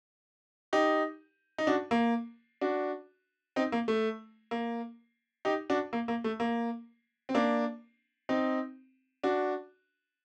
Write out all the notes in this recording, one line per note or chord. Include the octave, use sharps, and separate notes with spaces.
D#4 G4
D#4
D4 F#4
A#3
D4 F#4
C4 D#4
A#3
A3
A#3
D#4 G4
D4 F#4
A#3
A#3
A3
A#3
C4
A#3 D4
C4 D#4
D4 F#4